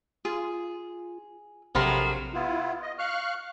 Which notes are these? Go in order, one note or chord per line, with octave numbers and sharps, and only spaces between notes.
F4 G#4
A#1 C3 F3 F#3 A4 A#4 B5 C6
B3 E4 F4
D#5
F5 C#6 F6 F#6